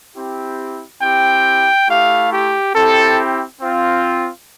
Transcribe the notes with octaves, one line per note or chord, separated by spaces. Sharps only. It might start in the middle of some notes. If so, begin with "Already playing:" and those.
C4 E4 G4
C4 E4 G4 G5
A3 E4 G4 F5
G4
C4 E4 G4 A4
C4 F4